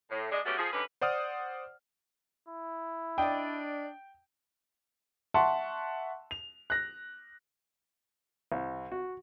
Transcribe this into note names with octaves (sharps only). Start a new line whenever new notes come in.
A2
G#3 D4 D#5
G#3 A3 B3 C#4 F#4 G4
F3 G#4
D3 C#4 D#4 G4 B4
C5 D5 F#5 D#6 F6
E4
D4 D5 D#5 G5
E5 F#5 A5 C6 C#6
F7
F#6 A#6
C2
F#4